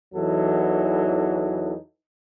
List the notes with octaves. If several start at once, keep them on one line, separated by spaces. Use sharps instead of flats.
E2 E3 F#3 D#4 A4